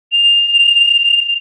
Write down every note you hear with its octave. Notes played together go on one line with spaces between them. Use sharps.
F7